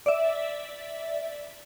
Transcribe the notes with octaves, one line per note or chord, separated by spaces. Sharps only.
D5 E5